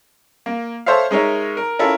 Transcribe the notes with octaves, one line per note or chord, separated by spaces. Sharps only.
A#3
A4 C5 C#5 E5 F5
G#3 D#4 A#4 C#5 E5
A#4
C#4 E4 F4 A4 A#4